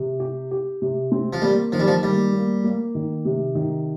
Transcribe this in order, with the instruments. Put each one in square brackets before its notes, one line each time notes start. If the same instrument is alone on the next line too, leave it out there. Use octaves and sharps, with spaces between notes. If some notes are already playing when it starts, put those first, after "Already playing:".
Already playing: [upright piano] C3
G4
G4
C3
C4
[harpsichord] F3
[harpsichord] G3 [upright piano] A#3
[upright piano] D#3 [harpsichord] F3
[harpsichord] G3
F3
[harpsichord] G3 [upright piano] A#3
[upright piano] A#3
A#3
D#3
C3
D#3